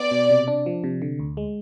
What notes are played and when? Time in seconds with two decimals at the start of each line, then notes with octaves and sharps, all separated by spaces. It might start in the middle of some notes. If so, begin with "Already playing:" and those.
Already playing: B3 D5
0.11 B2
0.30 C3
0.48 D4
0.66 F3
0.84 C3
1.02 D3
1.19 D2
1.37 G#3